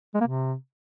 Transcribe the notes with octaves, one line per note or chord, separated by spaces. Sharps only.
G#3
A#3
C3